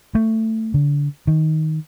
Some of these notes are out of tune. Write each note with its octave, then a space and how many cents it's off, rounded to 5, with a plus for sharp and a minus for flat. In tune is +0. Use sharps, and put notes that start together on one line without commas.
A3 +15
D3 -30
D#3 +10